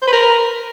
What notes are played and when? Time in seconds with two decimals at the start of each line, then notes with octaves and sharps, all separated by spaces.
0.02 C5
0.07 B4
0.13 A#4